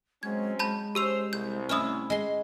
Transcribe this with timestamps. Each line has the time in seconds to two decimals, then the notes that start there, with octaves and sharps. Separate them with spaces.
0.23 F#3 G#3 C4 C#4 G#6
0.59 G#3 A5 B5 G6
0.95 C#4 G4 C5 E6 F7
1.33 C2 G6
1.69 A3 C#4 E4 D#6 F6
2.10 G#3 C6